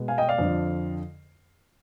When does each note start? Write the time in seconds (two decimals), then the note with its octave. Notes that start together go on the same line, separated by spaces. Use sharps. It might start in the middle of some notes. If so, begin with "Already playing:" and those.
Already playing: B2 G#3 B3
0.08 F5 G#5
0.18 D#5 G5
0.29 D5 F5
0.38 F2 D3 F3